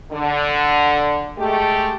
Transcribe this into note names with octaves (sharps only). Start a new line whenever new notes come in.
D3
G#3 A3 G4